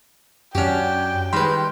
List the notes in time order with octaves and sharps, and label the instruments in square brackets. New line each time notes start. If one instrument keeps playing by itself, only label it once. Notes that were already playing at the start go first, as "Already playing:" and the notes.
[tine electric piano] F#2 [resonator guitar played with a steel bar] C#4 F#4 [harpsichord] D4 G4 [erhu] G5
[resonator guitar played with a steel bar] D#3 G3 G#3 [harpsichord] B4 B5 [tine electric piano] C6